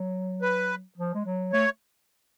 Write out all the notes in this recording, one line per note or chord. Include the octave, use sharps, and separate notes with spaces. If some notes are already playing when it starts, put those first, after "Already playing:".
Already playing: F#3
B4
F3
G#3
F#3
A3 C#5